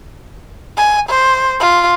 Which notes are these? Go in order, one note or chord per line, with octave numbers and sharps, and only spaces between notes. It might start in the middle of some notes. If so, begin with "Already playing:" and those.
G#5
C5
F4